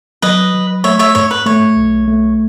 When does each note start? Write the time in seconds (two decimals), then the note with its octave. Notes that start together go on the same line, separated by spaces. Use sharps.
0.22 F#3 B4 D#5
0.54 F#3
0.84 A3 C#5 E5
0.99 C#5 E5
1.15 G#2 C#5
1.31 B4
1.46 A3 C#5
1.76 B1
2.07 A3